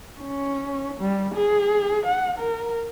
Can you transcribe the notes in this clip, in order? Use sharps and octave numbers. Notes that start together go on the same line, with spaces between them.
C#4
G3
G#4
F#5
A#4